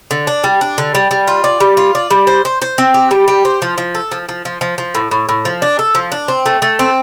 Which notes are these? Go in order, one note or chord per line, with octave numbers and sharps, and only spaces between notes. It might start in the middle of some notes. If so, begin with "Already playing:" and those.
D3
D4
G3
D4
D3
G3
G3
F4
D5
G3
F4
D5
G3
C5
C5
C5
C4
G4
G3
G4
C5
F3
F3
A4
F3
F3
F3
F3
F3
A2
A2
A2
F3
D4
A4
F3
D4
C4
A3
A3
C4